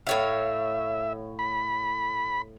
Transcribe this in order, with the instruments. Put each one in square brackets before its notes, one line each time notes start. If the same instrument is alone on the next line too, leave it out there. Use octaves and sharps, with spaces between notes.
[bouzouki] A2 C#5 F5 [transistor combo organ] E5
[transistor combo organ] B5